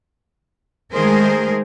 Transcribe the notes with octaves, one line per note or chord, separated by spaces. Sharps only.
D#3 G#3 A3 G#4 A#4 C5